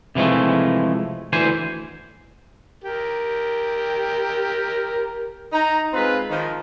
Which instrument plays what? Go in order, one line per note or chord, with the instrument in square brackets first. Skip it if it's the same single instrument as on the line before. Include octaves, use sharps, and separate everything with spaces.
[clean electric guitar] C3 E3 F3 G#3 A3
D2 E3 C5 G#5
[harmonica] G4 A#4
[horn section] D#4 A#5
G#3 C4 F4 B4
D#3 F3